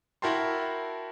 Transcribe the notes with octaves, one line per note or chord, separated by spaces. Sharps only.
E4 F#4 A#4 G5 A5 C6